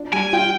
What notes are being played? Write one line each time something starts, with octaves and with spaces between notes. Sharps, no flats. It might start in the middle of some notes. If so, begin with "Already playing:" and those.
Already playing: D4 F4
G3 G#5
F4 G5